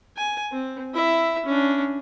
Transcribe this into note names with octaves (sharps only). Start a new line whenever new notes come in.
G#5
C4
E4 E5
C#4 D4